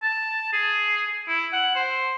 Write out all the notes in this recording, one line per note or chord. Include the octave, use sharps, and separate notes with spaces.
A5
G#4
E4
F#5
C5